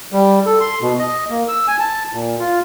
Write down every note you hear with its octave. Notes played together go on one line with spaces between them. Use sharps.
G3
A4
C6
B2
D#5
A#3
E6
G#5
A5
A#2
F4